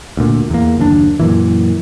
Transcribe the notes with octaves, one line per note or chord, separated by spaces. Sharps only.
D2 A#2
E2 A#3
F#1 D#2 D4
F#2 A#2 E3